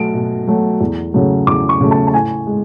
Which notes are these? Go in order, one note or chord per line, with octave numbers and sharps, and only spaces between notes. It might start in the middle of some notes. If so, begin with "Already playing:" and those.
Already playing: B2 F#3 A3 D7
B2
F#3 A3
E2
C#3 F#3 A3
E2 D6
C#6
C#3 F#3 A3
A5
A5
A2 G#5
G#3